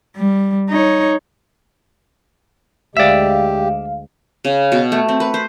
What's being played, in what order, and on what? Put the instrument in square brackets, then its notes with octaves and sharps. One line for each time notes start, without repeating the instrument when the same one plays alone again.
[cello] G3
D#4 C#5
[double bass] D2 G#3 [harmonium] G4 [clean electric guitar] D5 E5 [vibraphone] F5
[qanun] C#3
B2
A3
C4
B4
C5